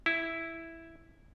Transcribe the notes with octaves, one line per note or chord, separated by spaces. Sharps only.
E4